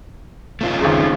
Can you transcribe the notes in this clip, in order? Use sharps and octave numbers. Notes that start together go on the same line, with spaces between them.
A3 C#4 F4
G#1 C#2